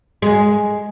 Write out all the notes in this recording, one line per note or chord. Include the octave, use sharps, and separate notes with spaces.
G#3